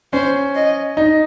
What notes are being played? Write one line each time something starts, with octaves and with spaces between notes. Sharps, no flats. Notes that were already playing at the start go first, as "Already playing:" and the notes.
C#4 C5
D#5
D#4